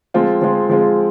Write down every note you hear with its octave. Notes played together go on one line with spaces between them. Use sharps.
F3 G#3 C4 F4
F3 G#3 C4 F4
F3 G#3 C4 F4